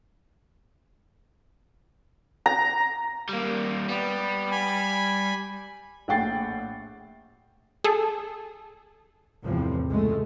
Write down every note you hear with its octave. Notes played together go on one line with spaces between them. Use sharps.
A#5
G3 A#3
G3 B3
G#5 B5
A#1 A2 F#5 G5 A6 C7
G#4 A4
E2 A2 C3 E3 F3
C#2 G#3 A3